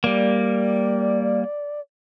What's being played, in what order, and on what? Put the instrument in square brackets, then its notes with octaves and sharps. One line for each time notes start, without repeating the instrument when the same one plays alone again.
[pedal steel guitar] G3 A#3 [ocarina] D5